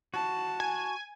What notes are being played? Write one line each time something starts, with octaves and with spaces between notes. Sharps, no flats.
F#4 A5
G#5